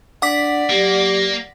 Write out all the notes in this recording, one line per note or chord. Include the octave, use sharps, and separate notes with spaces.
D4 D5 F#5 D6 B6
F#3 A#3 G4